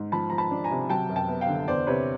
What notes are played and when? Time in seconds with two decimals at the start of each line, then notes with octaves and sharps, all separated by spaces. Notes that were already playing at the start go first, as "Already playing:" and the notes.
Already playing: G#2
0.12 F3 A5 B5
0.30 F3 A#5
0.38 A5 B5
0.51 D4
0.64 G#5 A#5
0.71 C3
0.90 F#3 G5 A5
1.09 F#2
1.16 G5 A5
1.29 B3
1.41 F5 G5
1.48 D3
1.68 E2 C5 D5
1.87 C3 B4 C#5